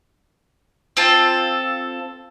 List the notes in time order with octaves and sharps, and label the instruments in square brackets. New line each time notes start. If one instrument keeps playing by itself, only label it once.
[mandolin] C4 F4 A4